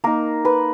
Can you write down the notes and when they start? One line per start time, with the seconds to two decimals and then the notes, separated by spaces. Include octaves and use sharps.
0.04 A#3 D#4 A#4
0.45 B4